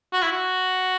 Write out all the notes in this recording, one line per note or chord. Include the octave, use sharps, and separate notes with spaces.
F#4
E4
F#4